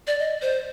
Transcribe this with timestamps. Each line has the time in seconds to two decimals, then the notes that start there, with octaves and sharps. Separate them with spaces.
0.07 D5
0.19 D#5
0.42 C5